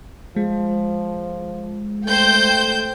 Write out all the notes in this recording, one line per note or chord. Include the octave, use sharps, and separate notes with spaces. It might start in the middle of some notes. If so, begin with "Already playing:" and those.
F3 G#3
A3 C5 G5 G6